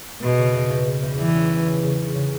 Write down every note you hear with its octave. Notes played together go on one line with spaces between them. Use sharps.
E2 B2
C#3
E2
E2
E2
E2
E3 G3
C#4
E2
C#3
C#3
C#4
C#3